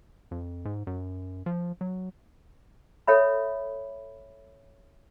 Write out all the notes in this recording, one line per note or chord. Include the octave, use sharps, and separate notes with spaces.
F2
G#2
F#2
F3
F#3
A4 C#5 E5 B5